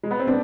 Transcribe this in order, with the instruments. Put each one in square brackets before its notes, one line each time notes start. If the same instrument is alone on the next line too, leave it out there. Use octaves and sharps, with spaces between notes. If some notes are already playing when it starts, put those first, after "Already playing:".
[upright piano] G#3
B3
C4
[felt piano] B3 [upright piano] D4